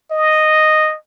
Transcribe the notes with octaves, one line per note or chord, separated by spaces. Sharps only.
D#5